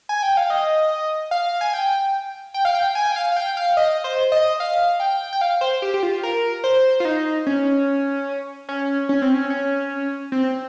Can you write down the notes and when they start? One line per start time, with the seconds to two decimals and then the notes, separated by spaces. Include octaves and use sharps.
0.09 G#5
0.23 G5
0.37 F5
0.50 D#5
1.31 F5
1.61 G#5
1.73 G5
2.54 G5
2.65 F5
2.75 G5
2.95 G#5
3.12 G5
3.16 F5
3.32 F5
3.37 G5
3.57 F5
3.77 D#5
4.04 C5
4.32 D#5
4.60 F5
5.00 G5
5.33 G5
5.41 F5
5.61 C5
5.82 G4
5.94 G4
6.03 F4
6.23 A#4
6.64 C5
7.00 F4
7.05 D#4
7.47 C#4
8.69 C#4
9.09 C#4
9.22 C4
9.34 C#4
9.50 C#4
10.32 C4